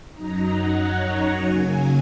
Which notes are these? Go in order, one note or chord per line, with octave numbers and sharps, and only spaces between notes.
F#2 F#3 D#4 A#5
F#5
C#5
F#5
C#3 F#3 A#3 G#5